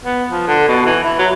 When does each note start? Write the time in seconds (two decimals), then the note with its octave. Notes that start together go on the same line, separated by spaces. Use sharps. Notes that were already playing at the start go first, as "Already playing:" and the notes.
0.05 B3
0.31 F3
0.47 D3
0.68 B2
0.86 E3
1.04 E4
1.19 F#3